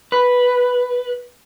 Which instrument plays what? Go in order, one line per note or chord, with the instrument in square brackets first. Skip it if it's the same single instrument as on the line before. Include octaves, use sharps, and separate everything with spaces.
[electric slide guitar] B4